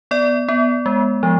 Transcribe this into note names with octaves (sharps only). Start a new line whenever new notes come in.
B3 D5
B3
G#3
F3